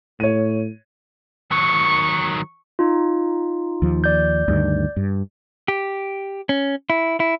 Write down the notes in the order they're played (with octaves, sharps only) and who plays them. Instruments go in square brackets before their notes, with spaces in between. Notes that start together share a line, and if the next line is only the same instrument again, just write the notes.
[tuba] A2 [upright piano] C#5 D#7
[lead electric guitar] D#3 F#3 [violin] C#6
[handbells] D#4 F4
[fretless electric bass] D#2 F3
[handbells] D5 G6
[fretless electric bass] D2 G2 D#3
G2
[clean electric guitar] G4
C#4
E4
E4